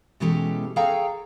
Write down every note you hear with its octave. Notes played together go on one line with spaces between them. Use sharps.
B2 E3 G#3 C#4 G4 A4
G#4 A4 C#5 F5 G5 A#5